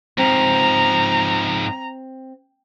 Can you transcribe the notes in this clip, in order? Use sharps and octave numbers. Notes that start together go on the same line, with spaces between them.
G#2 F3 C4 A#5